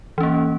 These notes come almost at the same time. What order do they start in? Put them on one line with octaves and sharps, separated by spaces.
E3 C#4 A#3